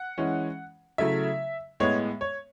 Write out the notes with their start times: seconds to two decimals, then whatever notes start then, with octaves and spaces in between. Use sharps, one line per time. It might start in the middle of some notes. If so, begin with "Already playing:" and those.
Already playing: F#5
0.18 E3 G#3 C#4
0.98 C#3 F#3 A3 E4 E5
1.80 A2 G#3 B3 C#5
2.21 C#5